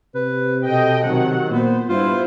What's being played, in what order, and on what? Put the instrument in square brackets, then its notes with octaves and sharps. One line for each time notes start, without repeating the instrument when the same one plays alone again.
[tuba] C3 [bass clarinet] B4
[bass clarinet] B2 [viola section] A4 D#5 G5
[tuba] C3 [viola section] D#3 F#3 F#5
[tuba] A#2 [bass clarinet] B3 [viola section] C5
[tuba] G2 [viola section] B3 E4 C5 [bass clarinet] F4